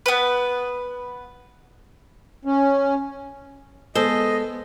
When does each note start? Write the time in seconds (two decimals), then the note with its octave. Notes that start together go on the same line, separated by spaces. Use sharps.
0.06 B3 B4
2.45 C#4
3.95 G#3 B3 A4 C5 D#5